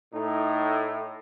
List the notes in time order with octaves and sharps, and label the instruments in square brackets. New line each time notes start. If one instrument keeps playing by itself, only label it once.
[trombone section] A2 [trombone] D#4